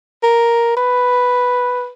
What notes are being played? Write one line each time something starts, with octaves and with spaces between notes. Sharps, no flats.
A#4
B4